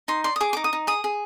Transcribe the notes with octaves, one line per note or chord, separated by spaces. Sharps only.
D#4 C6
D5 C6
D#6
G#4 D6
D#4 D6
D#6
D#4
G#4 D#6
G#4